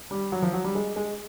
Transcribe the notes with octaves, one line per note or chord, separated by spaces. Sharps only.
G3
F#3
F3
F#3
G3
G#3
G#3